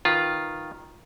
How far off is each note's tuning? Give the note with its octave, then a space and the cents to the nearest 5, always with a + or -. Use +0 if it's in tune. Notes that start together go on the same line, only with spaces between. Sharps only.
D#3 +0 F4 +0 B4 +0